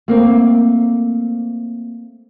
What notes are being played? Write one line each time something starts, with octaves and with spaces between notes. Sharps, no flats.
A3 A#3 C4